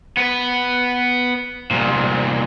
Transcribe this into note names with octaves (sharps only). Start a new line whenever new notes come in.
B3 B4
C2 A#2